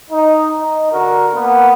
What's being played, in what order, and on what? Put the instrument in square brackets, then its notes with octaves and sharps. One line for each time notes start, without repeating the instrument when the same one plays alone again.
[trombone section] D#4
D#4
D3 F#4 A#4
A#3 B3